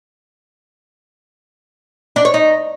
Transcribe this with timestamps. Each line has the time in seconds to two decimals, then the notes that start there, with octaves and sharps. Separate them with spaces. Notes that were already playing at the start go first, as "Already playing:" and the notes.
2.16 D4
2.25 C#5
2.34 D#4